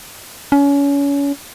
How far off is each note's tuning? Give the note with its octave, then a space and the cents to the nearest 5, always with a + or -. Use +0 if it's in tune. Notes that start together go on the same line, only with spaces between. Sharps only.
C#4 +30